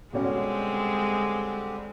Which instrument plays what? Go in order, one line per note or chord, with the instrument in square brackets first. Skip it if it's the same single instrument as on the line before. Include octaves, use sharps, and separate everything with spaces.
[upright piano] B2 C#4 F#4 [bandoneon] D3 G3 G4 [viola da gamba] G#3 C4